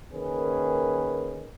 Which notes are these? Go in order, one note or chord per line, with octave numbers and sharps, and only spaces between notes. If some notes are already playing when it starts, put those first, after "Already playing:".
D#3 A#3 C#4 G#4 B4